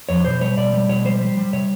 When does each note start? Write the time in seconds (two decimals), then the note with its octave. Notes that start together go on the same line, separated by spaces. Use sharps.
0.09 F2 C#5
0.25 B2 C5
0.41 G3 C#5
0.57 B2 D5
0.73 G3
0.89 B2 C#5
1.05 G3 C5
1.21 G3
1.37 G3
1.53 C3 C#5